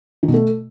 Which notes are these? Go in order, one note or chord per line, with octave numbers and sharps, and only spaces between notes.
D#3
B2
A3